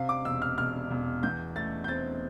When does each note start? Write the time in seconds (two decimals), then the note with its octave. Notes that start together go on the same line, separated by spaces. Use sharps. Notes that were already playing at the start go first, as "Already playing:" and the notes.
Already playing: C3 F5
0.09 D6
0.25 E1 E6
0.42 F6
0.58 E1 F6
0.91 E1
1.23 E2 G6
1.56 A3 A6
1.84 G6
1.88 C4 A6